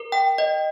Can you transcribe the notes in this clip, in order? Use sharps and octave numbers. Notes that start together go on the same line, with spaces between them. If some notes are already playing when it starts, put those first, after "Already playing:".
Already playing: A#4
G5
D#5